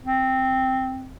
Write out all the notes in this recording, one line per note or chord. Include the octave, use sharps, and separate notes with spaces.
C4